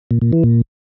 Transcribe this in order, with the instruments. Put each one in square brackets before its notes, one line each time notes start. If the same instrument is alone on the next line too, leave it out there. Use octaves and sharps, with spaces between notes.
[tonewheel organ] A#2
A#2
E3
A#2